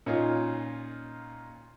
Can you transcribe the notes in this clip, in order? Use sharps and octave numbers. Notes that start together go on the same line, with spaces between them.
A#2 C#4 D#4 F4